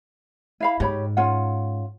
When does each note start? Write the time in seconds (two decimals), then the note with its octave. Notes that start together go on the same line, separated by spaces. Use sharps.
0.60 E4 F5 B5
0.80 G#2 G4 C#5 B5
1.17 C#4 F4 F#5